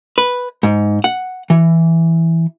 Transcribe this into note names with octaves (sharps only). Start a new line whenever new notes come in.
B4
G#2
F#5
E3